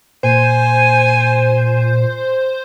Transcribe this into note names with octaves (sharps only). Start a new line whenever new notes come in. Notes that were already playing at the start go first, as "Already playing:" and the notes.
A#2 C5 G#5